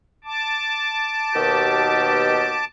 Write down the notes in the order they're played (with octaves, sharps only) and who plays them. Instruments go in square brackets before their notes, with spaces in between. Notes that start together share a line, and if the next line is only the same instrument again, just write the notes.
[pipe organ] A5 D6
[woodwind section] D#2 B2 G4